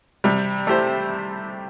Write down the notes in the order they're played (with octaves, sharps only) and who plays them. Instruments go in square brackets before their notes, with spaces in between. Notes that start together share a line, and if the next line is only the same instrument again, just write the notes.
[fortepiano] C3 [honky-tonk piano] G3
[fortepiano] A3 E4 G4 C5